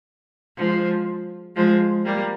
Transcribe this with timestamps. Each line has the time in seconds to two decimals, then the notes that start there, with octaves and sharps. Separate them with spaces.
0.57 F3 G#3
1.56 F3 G#3
2.05 G3 A#3